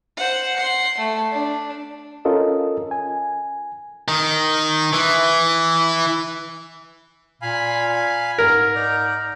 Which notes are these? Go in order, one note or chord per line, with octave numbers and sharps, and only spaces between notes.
C5 F#5
F#5 C6
A3
D4
C#4 F4 A4 A#4 D#5
G#5
D#3
E3
A#2 F5 G#5 B5
G#2 A#4
D#4 D5 A#5